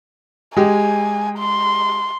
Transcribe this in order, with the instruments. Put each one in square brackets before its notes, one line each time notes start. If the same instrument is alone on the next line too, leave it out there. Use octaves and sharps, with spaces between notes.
[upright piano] G#3 G4 [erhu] G#5
[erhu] C6